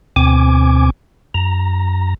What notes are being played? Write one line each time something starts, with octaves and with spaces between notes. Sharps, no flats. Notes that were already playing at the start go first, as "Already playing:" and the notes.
D2 B2 C4 G#5 D6
F#2 A#5